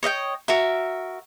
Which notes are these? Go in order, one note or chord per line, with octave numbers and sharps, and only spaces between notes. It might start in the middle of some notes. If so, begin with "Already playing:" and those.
C#5 D#5 E5 G5
F#4 A#4 E5